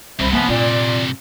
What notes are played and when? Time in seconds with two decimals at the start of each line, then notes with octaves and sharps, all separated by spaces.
0.19 C2 G2 C3 C5 E5 B5
0.32 F3 A#3 B3 E5 G#5
0.49 A#2 C4 D5